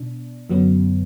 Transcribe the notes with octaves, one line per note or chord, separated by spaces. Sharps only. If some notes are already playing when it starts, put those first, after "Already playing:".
Already playing: B2 D4
F#2 D3 F#3 B3